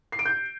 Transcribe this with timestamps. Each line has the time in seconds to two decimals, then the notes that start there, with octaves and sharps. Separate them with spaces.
0.12 C7
0.19 D7
0.25 G6